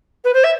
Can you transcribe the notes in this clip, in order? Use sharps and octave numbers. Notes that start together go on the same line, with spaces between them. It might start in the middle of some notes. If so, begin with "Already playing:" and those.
B4
C5
E5